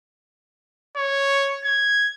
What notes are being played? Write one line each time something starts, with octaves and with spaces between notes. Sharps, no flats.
C#5
G#6